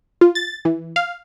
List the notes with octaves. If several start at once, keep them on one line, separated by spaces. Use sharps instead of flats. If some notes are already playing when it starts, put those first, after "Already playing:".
F4
A6
E3
F5